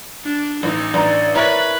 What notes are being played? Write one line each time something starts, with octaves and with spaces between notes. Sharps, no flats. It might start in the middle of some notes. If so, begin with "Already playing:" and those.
D4
A1 D#4
A1 D4 D5 A#5
E4 A#4 B4 C#5